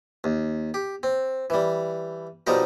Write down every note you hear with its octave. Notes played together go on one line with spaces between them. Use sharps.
D#2
G4
C4
E3 G3
B1 F3 G3 D#4 A#4